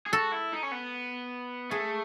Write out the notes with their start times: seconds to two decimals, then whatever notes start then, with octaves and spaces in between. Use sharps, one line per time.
0.06 G#4
0.13 F#4 A4
0.32 E4
0.53 D#4
0.63 C#4
0.72 B3
1.71 A3 G#4